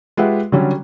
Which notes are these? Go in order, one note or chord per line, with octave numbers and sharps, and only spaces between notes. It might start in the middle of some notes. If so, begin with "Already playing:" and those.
G#3 F4 G4 B4 E5 F#5
D3 F#3 G3 C#4 F#4